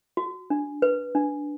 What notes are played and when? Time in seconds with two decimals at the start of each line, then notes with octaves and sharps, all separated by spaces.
0.17 F#4
0.50 D4
0.82 B4
1.15 D4